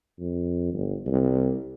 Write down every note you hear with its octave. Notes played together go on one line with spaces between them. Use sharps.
F2
G1
C2